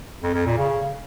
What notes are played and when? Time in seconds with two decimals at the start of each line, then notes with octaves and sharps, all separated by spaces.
0.23 F2
0.34 F2
0.46 A#2
0.58 C#3